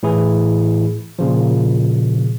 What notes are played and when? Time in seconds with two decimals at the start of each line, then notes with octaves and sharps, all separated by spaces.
0.03 A2 E3 E4 G#4
1.19 A#2 C#3 F3